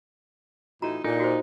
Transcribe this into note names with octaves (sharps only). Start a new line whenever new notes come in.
A2 E3 D#4 F4 F#4 A#5
A#2 D4 D#4 A4 G#5
F#4 C5